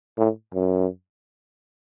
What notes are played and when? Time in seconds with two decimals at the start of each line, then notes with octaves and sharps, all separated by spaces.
0.18 A2
0.54 F#2